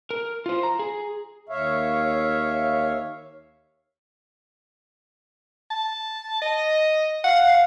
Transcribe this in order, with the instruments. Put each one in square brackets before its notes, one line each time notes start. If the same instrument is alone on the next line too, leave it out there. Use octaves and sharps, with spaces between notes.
[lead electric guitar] A#4
F4 C5
A#5
G#4
[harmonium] D#2 C#5 E5 F5
[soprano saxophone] A5
D#5
[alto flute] F5 [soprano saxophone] F#5